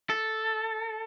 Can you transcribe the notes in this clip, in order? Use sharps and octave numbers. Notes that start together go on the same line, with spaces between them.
A4